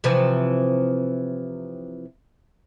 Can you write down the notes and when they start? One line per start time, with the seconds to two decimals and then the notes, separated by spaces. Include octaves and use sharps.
0.04 C3 E3 F3